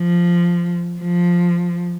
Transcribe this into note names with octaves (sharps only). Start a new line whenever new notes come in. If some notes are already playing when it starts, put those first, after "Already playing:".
Already playing: F3
F3